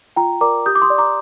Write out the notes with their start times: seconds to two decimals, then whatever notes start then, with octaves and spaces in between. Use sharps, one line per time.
0.16 F4 G5 A#5
0.41 A#4 D5 A#5 D6
0.66 G4 D#6 G6
0.75 D6
0.82 C6 D#6
0.90 D5
0.98 A#5 D6